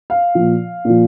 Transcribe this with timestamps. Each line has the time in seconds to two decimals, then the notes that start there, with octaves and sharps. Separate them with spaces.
0.10 F5
0.35 A#2 F3
0.85 A#2 F3